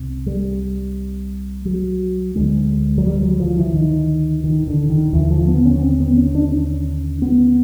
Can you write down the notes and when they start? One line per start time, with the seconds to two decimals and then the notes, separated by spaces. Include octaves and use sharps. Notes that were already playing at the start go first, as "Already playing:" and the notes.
Already playing: C2 C3
0.26 G3
1.65 F#3
2.35 D2 D3 G#3
2.98 F#3
3.05 G3
3.22 F#3
3.40 F3
3.57 E3
3.74 D#3
4.44 D#3
4.67 D3
4.89 D#3
5.13 D#2 D3 E3
5.30 F3
5.48 B3
5.65 C#4
5.82 C4
6.00 B3
6.17 C#4
6.35 D4
6.52 C#4
7.22 B3